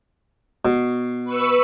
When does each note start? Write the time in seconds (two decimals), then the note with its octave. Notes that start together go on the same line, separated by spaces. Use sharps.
0.65 B2
1.24 B4 C#6 E6